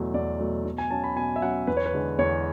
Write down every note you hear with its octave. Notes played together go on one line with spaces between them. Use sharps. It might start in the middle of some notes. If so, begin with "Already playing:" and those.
Already playing: E2 B2 F#3 A3
E2 D5
B2 F#3 A3
B2
G#5
F#3 C#4 A5
B5
B2 G#5
E5
F#3 C#4 F#5
E2 B4
C#5
B4
D3 G#3
E2 C#5